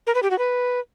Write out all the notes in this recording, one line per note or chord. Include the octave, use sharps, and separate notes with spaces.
A#4
B4
G4
F#4
B4